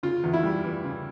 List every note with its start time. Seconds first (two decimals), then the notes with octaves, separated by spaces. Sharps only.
0.03 C#3 F4
0.24 E2
0.33 E4
0.43 G3
0.64 E3
0.84 C#3